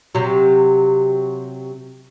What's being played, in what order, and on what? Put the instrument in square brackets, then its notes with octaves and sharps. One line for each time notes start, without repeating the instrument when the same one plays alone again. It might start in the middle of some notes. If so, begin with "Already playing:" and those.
[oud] C3 F#3